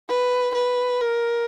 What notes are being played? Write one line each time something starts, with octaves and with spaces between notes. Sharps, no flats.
B4
B4
A#4